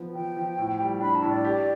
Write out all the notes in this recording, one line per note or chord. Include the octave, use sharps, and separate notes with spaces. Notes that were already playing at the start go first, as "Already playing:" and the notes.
Already playing: F3 B3
F3 G5
F3
A2
G3
D4 B5
A5
A2
D5
G4